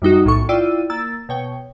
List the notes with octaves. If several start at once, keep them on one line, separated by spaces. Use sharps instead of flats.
F#2 G3 D#4 F#4
B1 A2 E3 A4 C#6
E4 F4 D5 G5 E6 D#7
A#3 E6 A6
B2 C#5 G5